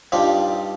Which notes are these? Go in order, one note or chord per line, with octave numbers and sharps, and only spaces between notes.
G2 F3 C4 D#4 G4